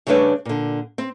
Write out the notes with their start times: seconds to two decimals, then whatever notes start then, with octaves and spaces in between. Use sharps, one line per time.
0.07 C#3 G3 A3 D4 B4 C#5
0.45 A#2 D3
0.98 C4